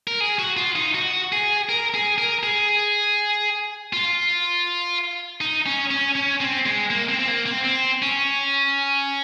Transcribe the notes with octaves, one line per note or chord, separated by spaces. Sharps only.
A#4
G#4
F#4
F4
D#4
F#4
G#4
A#4
G#4
A#4
G#4
F4
D#4
C#4
C#4
C#4
C4
G#3
A#3
C4
C4
A#3
C4
C4
C#4